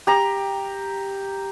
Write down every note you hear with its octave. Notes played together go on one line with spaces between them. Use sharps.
G4 A#5